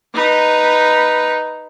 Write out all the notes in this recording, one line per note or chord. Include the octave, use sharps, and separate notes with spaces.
D#4 B4